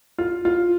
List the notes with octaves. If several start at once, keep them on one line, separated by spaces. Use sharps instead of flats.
F4
F4